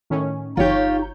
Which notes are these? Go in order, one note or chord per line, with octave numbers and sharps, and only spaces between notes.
A2 D#3 C#4
G1 D#4 F4 G4 C#5 G6